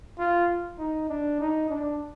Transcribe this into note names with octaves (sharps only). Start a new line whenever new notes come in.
F4
D#4
D4
D#4
D4